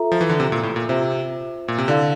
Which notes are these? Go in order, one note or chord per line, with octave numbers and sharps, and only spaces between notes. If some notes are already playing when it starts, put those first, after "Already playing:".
Already playing: F4 A4 E5 A#5
F3
E3
D3
C3
A#2
A2
A#2
C3 F4 C5 E5
A#2
C3
D3 E4 A4 D5 F5